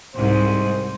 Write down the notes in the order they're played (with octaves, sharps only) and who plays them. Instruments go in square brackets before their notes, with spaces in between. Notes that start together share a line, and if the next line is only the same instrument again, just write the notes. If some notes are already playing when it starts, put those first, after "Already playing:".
[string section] C2 G#2 [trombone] C5